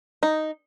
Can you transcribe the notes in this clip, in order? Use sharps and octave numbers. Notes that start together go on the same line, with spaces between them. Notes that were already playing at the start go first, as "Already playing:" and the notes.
D#4